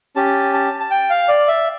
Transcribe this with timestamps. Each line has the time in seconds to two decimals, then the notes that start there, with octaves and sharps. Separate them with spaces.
0.16 C#4 G4 A5
0.54 A5
0.80 A5
0.91 G5
1.10 F5
1.28 D5
1.48 E5